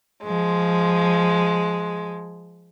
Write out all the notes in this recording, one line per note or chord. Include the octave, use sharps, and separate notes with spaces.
F3 G#3